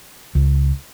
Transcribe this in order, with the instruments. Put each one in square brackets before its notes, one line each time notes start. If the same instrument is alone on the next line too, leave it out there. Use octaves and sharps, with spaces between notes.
[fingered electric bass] C#2